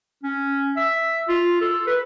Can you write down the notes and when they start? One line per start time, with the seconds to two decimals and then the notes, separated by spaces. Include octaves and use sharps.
0.24 C#4
0.77 E5
1.29 F4
1.61 A4
1.87 B4